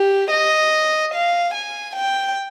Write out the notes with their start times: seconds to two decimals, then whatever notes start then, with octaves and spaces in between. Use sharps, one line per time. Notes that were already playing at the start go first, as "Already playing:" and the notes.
Already playing: G4
0.31 D#5
1.14 F5
1.54 G#5
1.96 G5